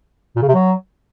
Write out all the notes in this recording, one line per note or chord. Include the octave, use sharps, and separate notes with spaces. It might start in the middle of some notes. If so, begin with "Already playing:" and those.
A#2
C#3
C3
F#3